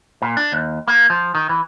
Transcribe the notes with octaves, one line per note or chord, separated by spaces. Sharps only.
A#2
D4
D#2
A#3
F3
D#3
E3